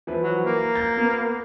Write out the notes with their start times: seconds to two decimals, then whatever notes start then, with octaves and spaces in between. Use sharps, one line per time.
0.07 E3 F3 B4
0.22 F#3
0.46 A#3
0.75 A#5 G6 A6
0.97 B3